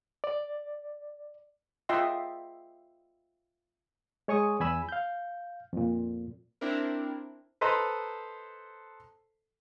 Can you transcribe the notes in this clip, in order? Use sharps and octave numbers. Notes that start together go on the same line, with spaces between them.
D5
F4 D#5 E5 G5 C6
G#3 C#5 G#5 C#6 D#6
E2 G#5 B5 E6
F5 G6
F2 A#2
C4 D4 E4 A#4
A4 B4 C5 D#5 A#5